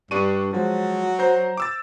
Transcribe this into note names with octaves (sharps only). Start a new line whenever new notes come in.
G2 D4 C#6 D#7
F3 F#3 G#3
C5 A#5 G6
D6 E6 A6